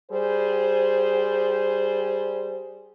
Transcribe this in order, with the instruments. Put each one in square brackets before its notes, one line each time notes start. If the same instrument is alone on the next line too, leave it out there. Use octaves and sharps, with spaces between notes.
[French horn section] G3 G#4 C5